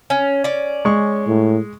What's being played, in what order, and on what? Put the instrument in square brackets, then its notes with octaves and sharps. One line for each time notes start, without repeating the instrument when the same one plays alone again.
[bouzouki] C#4
C#4 D5
[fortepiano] G#3 C#6
[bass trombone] A2